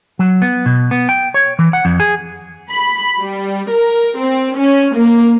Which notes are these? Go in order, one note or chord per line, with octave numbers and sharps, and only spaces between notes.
F#3
B3
B2
B3
G5
C#5
E3
F#5
F2
G#4
B5
G3
A#4
C4
C#4
A#3